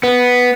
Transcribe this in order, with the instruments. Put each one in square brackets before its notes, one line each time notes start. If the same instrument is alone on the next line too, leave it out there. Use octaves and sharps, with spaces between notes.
[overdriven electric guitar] B3